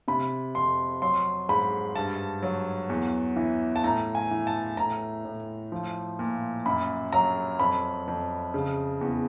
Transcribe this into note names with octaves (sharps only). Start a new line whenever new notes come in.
C3 B5
F2 C6
F#3 C6
G#2 B5
G2 A5
F#3
E2
E3
A5
A2 A#5
G#5
E3
A5
A2 A#5
A2
F3
A#2
F#2 B5
F#3 A#5
F2 B5
F2
C#3
E2